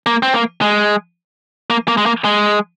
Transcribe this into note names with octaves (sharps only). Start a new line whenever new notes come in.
A#3
C4
A#3
G#3
A#3
A#3
G#3
A#3
G#3